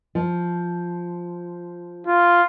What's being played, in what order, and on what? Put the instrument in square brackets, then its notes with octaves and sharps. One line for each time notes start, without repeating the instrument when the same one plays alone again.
[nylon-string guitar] F3
[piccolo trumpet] F4